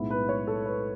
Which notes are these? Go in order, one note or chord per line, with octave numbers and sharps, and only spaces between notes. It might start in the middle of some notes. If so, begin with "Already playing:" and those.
Already playing: B1 A2 G#3 B3 E4
B4
C#5
A4
B4